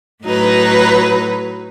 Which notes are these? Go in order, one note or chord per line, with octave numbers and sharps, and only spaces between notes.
A2 F#3 D#4 B4